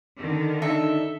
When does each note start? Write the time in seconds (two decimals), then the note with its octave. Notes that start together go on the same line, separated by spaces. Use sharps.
0.20 D3 D#3
0.62 D4 D#4 A4 E5